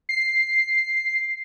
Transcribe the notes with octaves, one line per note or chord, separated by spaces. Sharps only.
C7